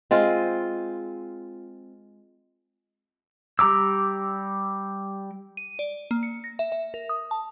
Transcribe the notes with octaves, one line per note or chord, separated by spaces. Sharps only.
G#3 C4 F4
G3 G4 A#5 D6 E6
D#7
D5
A#3
C#7
A#6
E5
E5
A#4
D#6
A5